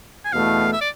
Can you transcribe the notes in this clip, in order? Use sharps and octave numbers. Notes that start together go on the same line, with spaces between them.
G#5
E2 B2 A3 E4 F5
E5
D5